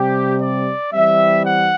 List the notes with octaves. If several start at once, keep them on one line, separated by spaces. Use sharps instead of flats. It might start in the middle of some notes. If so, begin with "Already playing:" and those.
Already playing: C3 G3 C4 G4
D5
E3 G3 C4 E5
F#5